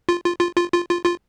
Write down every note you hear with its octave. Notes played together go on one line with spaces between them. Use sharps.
F4
F4
F4
F4
F4
F4
F4